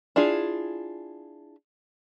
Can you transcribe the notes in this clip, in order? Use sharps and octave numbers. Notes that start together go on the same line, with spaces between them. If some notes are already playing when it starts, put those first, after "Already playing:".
D4 E4 F4 G#4